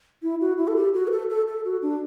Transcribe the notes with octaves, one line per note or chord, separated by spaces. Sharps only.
E4
F#4
E4
A4
G4
F#4
B4
A4
A4
A4
F#4
D4